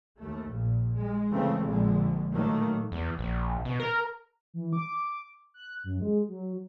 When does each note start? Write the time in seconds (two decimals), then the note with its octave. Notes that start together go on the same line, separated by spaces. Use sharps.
0.19 D#2 A3
0.49 A#1 A#2
0.94 G#3
1.31 C#3 E3 G#3 A3 C4
1.61 A#1 D3 G#3
2.32 A2 D#3 F#3 A3 A#3
2.92 E2
3.19 A#1
3.65 B2
3.80 A#4
4.54 E3
4.73 D6
5.54 F#6
5.84 F#2
6.02 G#3
6.28 F#3